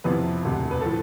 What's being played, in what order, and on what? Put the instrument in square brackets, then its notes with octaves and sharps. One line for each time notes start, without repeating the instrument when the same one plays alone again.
[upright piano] F2 C3 F3 B3 E4 B4
E1 D2 C3
B4
A2 F3 A4